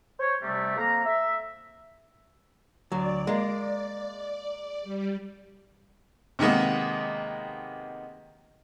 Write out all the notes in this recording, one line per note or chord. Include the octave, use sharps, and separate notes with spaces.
C5 C#5
C3 G3 A3
F2 A#3 F5 A#5
E5
D2 F#3 D5
G#3 A#3
G3
C3 D#3 G#3 A#3 B3